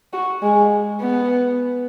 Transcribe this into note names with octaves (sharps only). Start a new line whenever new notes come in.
F#4
G#3
B3